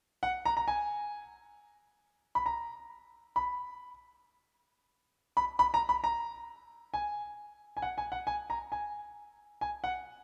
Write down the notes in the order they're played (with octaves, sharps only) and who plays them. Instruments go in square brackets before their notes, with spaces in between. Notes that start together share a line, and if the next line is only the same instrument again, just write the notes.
[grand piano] F#5
A#5
A#5
G#5
B5
A#5
B5
B5
B5
A#5
B5
A#5
G#5
G#5
F#5
G#5
F#5
G#5
A#5
G#5
G#5
F#5